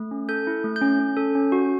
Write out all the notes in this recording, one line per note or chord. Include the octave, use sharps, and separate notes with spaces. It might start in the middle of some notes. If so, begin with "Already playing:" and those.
Already playing: A3
C#4
A4 G6
E4
A3
G6
C#4
C#4
A4
C#4
F#4